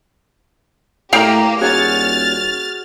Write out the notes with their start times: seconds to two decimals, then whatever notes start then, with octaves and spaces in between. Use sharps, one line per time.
1.13 A2 A#3 G4 F5 G5
1.61 D#1 F#4 G#4 C#5 F6 A6